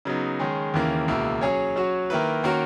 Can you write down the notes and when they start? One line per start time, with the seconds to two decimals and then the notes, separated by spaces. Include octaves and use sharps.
0.05 C#3 F#3 B3 D#4
0.40 D#3 G#3 C#4 G#4
0.74 D#2 C#3 E3 A#3
1.08 C#2 B2 A#3 E4
1.41 F#3 C#4 G#4 C#5
1.76 F#3 C#4 F#4
2.10 D#3 A#3 E4 B4
2.43 D#3 A#3 C#4 F#4 A#4